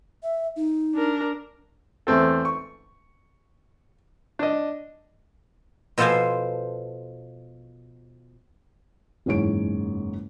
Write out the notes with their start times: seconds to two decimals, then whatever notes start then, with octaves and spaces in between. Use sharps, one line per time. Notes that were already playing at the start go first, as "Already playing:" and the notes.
0.23 E5
0.56 D#4
0.95 D4 A#4
2.07 E2 A3 C4 A4
2.45 C#6
4.39 D4 D#5
5.98 B2 F3 A4 C5 F5 G#5
9.26 F#1 E2 G#2 G#4 C#5 D7